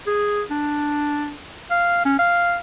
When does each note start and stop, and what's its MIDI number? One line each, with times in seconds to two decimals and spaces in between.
0.07 0.42 68
0.51 1.34 62
1.71 2.05 77
2.05 2.16 61
2.19 2.57 77